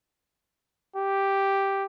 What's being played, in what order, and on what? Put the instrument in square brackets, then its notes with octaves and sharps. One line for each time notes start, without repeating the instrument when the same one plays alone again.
[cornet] G4